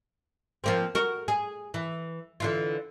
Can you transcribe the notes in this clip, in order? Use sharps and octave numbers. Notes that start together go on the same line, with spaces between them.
F3 A#3 C4
F#4 A#4
G#4
E3
D3 E3 F4